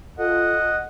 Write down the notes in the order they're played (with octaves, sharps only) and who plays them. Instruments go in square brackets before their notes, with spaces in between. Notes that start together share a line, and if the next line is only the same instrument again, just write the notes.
[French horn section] F4 A4 [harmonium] D#5 F#5